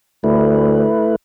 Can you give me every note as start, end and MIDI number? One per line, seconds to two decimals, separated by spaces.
0.24 0.86 38
0.24 1.16 57
0.24 1.16 64
0.24 1.16 71